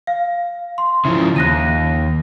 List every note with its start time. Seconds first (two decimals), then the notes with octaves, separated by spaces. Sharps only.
0.07 F5
0.78 C6
1.05 C#3 F3 E4 E5
1.36 D#2 F#6 A#6 D#7